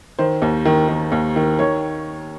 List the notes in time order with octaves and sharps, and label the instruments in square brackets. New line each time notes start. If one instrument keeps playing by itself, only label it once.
[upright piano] D#3 C5
D#2
D#3
D#3
D#2
D#3
D#3 C#5